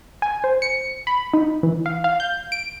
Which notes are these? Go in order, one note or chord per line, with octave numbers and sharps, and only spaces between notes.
G#5
C5
C#7
B5
D#4
E3
F5
F5
G6
D7